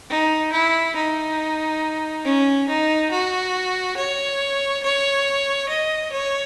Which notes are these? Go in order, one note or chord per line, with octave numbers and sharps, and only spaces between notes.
D#4
E4
D#4
C#4
D#4
F#4
C#5
C#5
D#5
C#5